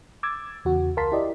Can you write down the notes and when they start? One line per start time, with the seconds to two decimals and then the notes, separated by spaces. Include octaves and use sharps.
0.23 D6 E6 G#6 A6
0.65 E2 C#3 F#4
0.97 C#2 A#4 F5 A5 C6 B6
1.12 E4 G4 D5 D#5